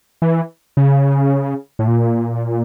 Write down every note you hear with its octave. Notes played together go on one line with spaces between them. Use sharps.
E3
C#3
A2
A#2